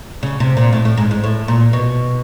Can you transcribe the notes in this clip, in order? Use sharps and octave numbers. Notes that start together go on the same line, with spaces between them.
C#3
C3
A#2
A2
A2
G#2
G#2
A2
A#2
B2